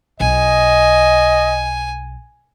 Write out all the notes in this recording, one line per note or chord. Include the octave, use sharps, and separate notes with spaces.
B1 D#5 G#5